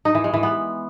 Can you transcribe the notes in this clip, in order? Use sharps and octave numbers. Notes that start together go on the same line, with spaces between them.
D#4
E3
G#3
E3
B3